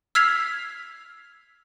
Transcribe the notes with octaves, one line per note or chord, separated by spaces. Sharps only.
E6 F6 G#6 B6 C7 F7